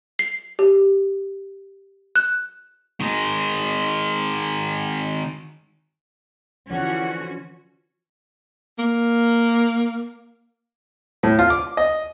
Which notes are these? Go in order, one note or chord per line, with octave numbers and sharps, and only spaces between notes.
C7
G4
F#6
D#3 G#3
D3 E3 F3 C#4 F#4 F#5
A#3
A2
F4
D6
D#5